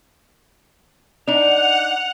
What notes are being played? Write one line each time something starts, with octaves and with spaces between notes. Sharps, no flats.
D4 D#4 F#5 F7